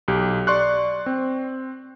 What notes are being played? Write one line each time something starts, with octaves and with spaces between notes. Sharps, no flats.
B1 G4
D5 C6 C#6 F#6
C4